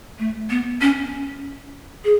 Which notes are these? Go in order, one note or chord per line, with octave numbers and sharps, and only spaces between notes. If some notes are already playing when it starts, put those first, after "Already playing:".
A3
B3
C#4
G#4